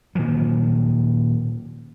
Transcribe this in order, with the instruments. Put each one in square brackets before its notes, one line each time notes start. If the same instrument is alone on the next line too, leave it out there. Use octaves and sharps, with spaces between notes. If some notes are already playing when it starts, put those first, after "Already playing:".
[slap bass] A#2 D#3 F3 F#3